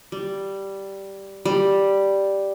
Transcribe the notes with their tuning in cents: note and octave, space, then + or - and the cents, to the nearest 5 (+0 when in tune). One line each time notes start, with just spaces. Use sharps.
G3 -5
G3 +0